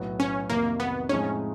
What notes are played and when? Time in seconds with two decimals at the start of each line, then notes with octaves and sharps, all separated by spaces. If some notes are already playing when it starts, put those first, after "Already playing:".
Already playing: B1 A2 F#3 B3
0.20 C#4
0.49 F2 C3 D#3 A#3
0.80 B3
1.09 A2 F3 G#3 C4 C#4 D#4